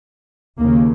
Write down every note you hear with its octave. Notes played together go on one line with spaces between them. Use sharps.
D#2 C#3 A#3